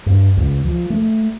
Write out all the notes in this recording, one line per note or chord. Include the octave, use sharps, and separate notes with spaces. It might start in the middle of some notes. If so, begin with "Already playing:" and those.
G2
C#2
F3
A3